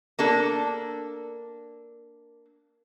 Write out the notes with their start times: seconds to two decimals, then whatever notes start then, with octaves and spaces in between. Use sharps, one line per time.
0.19 A#3 D4 A4